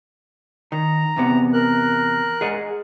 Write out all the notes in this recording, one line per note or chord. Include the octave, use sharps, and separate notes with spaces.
D#3 A#5
E2 C3 B3
A#4 F#6
G#4 D#5 F#5